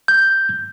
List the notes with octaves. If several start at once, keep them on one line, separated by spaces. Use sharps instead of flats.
G6